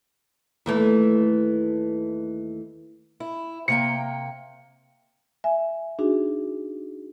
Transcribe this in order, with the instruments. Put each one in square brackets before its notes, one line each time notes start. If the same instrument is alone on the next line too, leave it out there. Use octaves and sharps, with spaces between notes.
[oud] D#2 E3 A3
[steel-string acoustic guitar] E4
[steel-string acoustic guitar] C3 A#3 G5 [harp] C#7
[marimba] E5 G#5
D4 D#4 F#4 G#4